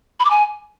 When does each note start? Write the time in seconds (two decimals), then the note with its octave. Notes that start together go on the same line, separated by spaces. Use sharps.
0.20 B5
0.25 D6
0.30 G#5